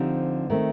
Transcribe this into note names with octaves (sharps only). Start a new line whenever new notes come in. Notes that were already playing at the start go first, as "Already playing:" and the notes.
Already playing: D3 F3 C4 D#4 G4
D#3 A3 C4